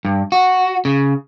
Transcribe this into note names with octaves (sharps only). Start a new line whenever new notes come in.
G2
F#4
C#3